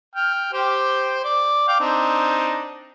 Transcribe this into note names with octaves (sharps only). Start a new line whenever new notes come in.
G5 F6
G4 C5 G5
D5
F5 G5 D6
C4 D4 D#4